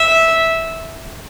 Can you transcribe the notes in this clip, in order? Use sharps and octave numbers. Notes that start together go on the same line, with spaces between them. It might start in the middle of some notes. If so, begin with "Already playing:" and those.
Already playing: E5